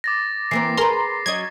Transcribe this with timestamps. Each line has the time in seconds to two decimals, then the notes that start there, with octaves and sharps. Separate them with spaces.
0.04 D6 A6 A#6
0.51 E3 A#3 C4 C7
0.77 G#4 A#4 B4 A#5 C6
1.26 F#3 C#4 D#5 G#6